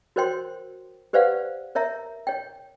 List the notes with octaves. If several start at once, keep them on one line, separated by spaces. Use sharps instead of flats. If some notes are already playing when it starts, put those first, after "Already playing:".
F#4 A#4 C5 C#5 G5 C6
G4 B4 C5 D5 F5 F#5
A#4 C#5 E5 A#5
C#5 G5